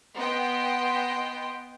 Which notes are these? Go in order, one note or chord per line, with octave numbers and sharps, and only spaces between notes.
B3 D#5 G5 C6